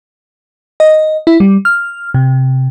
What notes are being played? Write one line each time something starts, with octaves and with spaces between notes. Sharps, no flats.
D#5
E4
G3
F6
C3